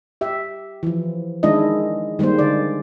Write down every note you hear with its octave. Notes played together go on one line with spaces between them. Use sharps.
G4 E5
E3 F3
D#3 G#3 D4 E4 D#5
D#3 G3 G#3 A#3 C5
D3 D5